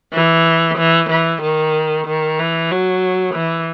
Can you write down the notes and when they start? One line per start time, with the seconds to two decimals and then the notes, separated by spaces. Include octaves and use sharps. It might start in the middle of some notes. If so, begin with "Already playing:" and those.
0.14 E3
0.78 E3
1.10 E3
1.43 D#3
2.07 D#3
2.39 E3
2.71 F#3
3.35 E3